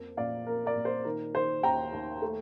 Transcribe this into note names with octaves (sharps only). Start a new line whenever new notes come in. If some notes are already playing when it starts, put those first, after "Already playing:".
Already playing: F2 A#3
A#2 D5 F5
A#3 A#4
A#4 D5
A#2
C5
D#3 A#4
D#3 C5
D#2 G5 A#5
D#2
A3